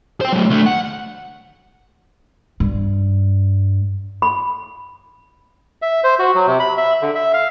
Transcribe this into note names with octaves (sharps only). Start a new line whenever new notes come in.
C5 G5
F#3 A3
D3 A3
F#5
G2
B5
E5
C5
F#4
F#3
C3
B5
E5
D3
E5
F5